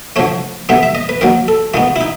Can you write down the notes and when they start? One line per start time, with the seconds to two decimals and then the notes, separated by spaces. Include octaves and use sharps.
0.16 D3 F3 A3 C#5
0.69 D3 G3 B3 E5
0.83 E5
0.95 D#5
1.09 B4
1.21 D#3 F#3 A#3 A#4
1.48 A4
1.74 D#3 G#3 B3 F4
1.96 E4
2.01 D#4